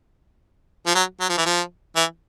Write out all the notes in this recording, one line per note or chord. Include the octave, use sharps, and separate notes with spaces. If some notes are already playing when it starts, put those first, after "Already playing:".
F3
F#3
F#3
F3
E3
F3
E3